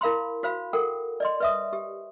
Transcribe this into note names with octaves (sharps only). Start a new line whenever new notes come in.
E4 A#4 F5 B5 C6
F#4 C5 F5 B5
A4 A#4 F#5 G5
D5 D#5 C6
B4 E5 D#6
G4